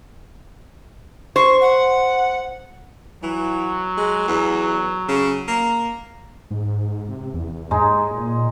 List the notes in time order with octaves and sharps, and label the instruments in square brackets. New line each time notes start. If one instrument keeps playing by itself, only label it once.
[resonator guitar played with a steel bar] C5 [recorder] C#6
[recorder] F#5
[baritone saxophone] E3 [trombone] F#3
[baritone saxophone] G#3
E2
C#3
A#3
[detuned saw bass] G#2
C3
E2
[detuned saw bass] G#2 [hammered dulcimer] G#3 D#4
[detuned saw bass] A#2